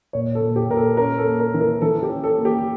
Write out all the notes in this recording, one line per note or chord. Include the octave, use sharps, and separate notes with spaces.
A#2 C#5
A4
A#2
G4
A#2 A#4
A4
C#4 A#4
A4
A#3
A#4
E3
A#4
E3 A4
G4
C#4
A4
A#3
G4